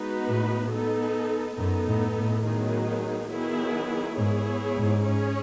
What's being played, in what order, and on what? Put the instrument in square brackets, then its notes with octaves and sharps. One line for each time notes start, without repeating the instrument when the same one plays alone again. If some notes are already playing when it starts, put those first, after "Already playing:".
Already playing: [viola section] G#3 B3 D#4 F#4 B4
[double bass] A2
[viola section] B3 D#4 A4
[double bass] F#2 [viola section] B3 D#4 A4
[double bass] A2
A2
[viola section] D#3 F#3 B3 D#4 G#4
D#3 F#3 B3 E4 G#4
[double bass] G#2 [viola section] B3 E4 G#4 C#5
[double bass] G#2
[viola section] C#4 G#4 C#5